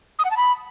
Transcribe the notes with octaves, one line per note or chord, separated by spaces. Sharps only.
D#6
F#5
A5
B5